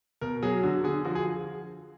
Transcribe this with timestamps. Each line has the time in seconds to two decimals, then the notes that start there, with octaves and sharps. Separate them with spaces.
0.21 B2 A#4
0.42 F#3 G#4
0.63 D3 F#4
0.84 D3 G#4
1.05 F3 F#4
1.15 G#4